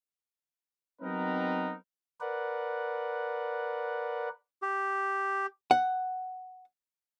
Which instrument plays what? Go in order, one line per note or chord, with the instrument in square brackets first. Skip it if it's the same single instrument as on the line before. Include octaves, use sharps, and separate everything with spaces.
[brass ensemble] F#3 B3 C4 D#4 A#4 B4
[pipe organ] A#4 B4 D5 F#5
[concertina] G4
[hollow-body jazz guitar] F#5